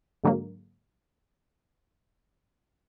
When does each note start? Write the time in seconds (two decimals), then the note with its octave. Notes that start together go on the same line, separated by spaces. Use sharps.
0.24 G#2 D3 F#3 G#3 A#3